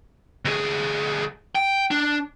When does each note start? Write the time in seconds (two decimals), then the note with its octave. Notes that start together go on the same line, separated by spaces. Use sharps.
0.45 D2 G#4
1.55 G5
1.91 D4